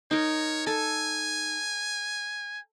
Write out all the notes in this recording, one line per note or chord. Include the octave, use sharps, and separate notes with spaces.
D#4 A#4 C#5
A4 G#5